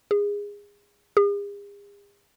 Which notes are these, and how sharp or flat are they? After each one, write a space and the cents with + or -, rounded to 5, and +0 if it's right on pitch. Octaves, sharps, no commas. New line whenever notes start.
G#4 -25
G#4 -45